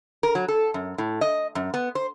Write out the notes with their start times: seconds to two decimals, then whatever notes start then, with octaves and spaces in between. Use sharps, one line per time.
0.23 A#4
0.35 F#3
0.48 A4
0.74 F#2
0.98 A2
1.21 D#5
1.55 F#2
1.74 B3
1.95 C5